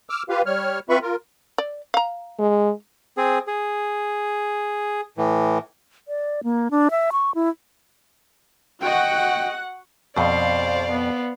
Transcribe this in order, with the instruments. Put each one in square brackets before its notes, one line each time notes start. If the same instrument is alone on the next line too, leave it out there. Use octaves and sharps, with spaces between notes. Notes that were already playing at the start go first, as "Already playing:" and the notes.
[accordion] D6 E6 F6
F4 G4 B4 F5
G3 C#5 F6
C4 F4 B4 E5 B5 C#6
F4 A#4
[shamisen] D5
F5 A#5
[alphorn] G#3
[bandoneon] C4 G#4
G#4
A2 E3
[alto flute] D5
A#3
D4
E5
C#6
E4
[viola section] F#4 F#5 [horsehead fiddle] D#5 G5
[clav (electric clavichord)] F2 B2 [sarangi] C5 [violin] D5 F5
[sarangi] B3